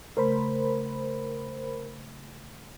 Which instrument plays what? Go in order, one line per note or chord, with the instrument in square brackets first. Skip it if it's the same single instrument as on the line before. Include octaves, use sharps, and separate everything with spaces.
[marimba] C#3 A3 [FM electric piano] A#4 C5 B5